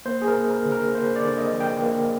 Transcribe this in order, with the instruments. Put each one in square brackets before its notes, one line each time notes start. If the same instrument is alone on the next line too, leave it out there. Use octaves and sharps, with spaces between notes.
[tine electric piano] A#3 C5
G#4
A#4
A#3
A#4
D3
A#4
A#3 C5
D5
D3
D#5
F3
G5
A#3